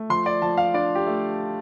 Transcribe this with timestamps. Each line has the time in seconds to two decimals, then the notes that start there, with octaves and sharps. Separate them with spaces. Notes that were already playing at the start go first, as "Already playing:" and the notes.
Already playing: A3
0.10 F3 C6
0.26 D5
0.42 F3 A5
0.57 F5
0.74 D4 D5
0.95 G4
1.07 A3